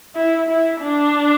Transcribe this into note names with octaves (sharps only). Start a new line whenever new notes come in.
E4
E4
D4